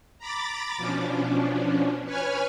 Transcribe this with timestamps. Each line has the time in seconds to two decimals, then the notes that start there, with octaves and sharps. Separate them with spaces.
0.19 A#5 B5 D6 A6
0.77 B2 F3 C#4 D4
2.05 B4 C#5 G#5 F6